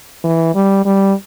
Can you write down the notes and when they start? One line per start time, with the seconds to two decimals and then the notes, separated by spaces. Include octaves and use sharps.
0.24 E3
0.55 G3
0.85 G3